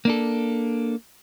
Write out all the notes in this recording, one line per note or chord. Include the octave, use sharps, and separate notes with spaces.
A#3 D4 A4